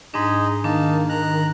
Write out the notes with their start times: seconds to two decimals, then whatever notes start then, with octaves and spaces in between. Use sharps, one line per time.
0.14 G#2 D4 D#4 G#4 D#5
0.64 D#3 A#3 D4 D#4 A5
1.09 A#5 F#6